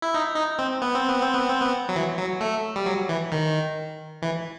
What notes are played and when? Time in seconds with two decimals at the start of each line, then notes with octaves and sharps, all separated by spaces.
0.02 E4
0.14 D#4
0.36 D#4
0.59 C4
0.82 B3
0.95 C4
1.09 B3
1.22 C4
1.35 B3
1.49 C4
1.62 B3
1.89 F#3
1.96 E3
2.19 F#3
2.41 A3
2.76 G3
2.86 F#3
3.09 E3
3.32 D#3
4.22 E3